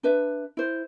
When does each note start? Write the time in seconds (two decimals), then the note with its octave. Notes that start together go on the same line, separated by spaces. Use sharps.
0.03 D4 B4 E5
0.57 E4 C5